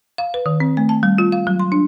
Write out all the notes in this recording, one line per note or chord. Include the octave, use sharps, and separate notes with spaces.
F5
B4
D#3
C4
A3
A5
G3
F4
F5
F#3
C6
D4